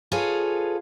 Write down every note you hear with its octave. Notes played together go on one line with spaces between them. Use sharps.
F4 G#4 A4 B4 C#5 F5